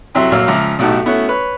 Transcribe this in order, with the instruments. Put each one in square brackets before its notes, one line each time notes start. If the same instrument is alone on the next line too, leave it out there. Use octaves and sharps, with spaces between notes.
[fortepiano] F2 C3 F#3 E4 E5 C6
A#1 F#3 A#3 F5 E6
C#2 F3 E5 A#5 D6
B1 A2 D#4 F#4 G4 A5
A3 B3 C#4 E4 F#4
B4 C#5